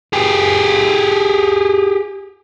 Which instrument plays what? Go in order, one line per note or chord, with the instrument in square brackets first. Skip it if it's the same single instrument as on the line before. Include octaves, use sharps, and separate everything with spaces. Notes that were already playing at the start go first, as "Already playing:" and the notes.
[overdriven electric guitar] G4 G#4